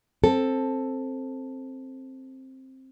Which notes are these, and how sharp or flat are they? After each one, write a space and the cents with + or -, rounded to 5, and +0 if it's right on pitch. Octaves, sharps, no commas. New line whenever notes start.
C4 +10 A4 +0